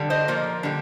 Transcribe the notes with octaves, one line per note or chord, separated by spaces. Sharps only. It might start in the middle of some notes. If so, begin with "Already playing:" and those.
Already playing: D3 G3
C5 D#5
A#2 F3 A#3
D3 G3